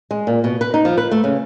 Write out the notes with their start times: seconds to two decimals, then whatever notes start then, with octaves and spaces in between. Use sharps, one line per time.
0.11 G#3
0.27 A#2
0.44 B2
0.61 B4
0.74 D#4
0.85 F3
0.97 B4
1.11 A3
1.24 C#3